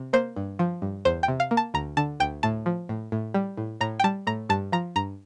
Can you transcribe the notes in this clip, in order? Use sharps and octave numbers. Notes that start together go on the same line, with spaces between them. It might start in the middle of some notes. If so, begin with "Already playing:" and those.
Already playing: C3
A#3 C5
G2
F3
G2
E2 C5
G5
C3
F5
A#3
A5
D2 A#5
D3 A5
D2 G5
A2 A5
F3
A2
A2
G3
A2
A2 A#5
G5
G3 A5
A2 A#5
G2 A5
F3 A#5
G2 A#5